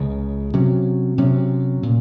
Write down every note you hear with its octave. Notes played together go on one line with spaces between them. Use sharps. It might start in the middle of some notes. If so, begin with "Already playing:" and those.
Already playing: C#2 C#3 G#3
C3 F#3 C#4
C3 F#3 C#4
A#2